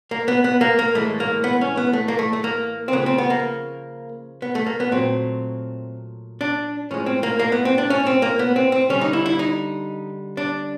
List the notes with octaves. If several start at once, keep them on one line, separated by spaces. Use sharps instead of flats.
A#3
B3
B3
A#3
A#3
A2 E3 G#3 A3
A#3
B3
C#4
B3
A3
A#3
A3
A3
A#3
C4
C#3 F3 A3 B3
C4
B3
A#3
B3
A3
A#3
B3
A#2 F#3 A3 C4
D4
A2 F3 G#3 C#4
C4
A#3
A#3
B3
C4
D4
C#4
C4
A#3
B3
C4
C4
D3 G3 C#4
D#4
E4
E4
D#4
D4